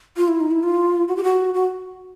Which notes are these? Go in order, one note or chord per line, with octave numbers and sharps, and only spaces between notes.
F4
E4
D#4
E4
F4
F#4
G4
F#4
F#4